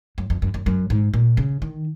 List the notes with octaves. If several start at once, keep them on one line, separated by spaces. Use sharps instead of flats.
F#2
F2
F#2
F#2
F#2
G#2
A#2
C#3
D#3